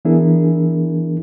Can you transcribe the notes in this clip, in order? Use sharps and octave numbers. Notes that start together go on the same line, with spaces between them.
E3 B3 D4 E4 G#4 A#4